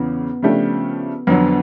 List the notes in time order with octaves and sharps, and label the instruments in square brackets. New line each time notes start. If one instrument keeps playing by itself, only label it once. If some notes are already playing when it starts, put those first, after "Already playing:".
Already playing: [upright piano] E2 C#3 E3 [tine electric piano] B3
[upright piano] C#3 F3 A3 D4 G4
[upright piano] F2 D3 F#3 [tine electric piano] B3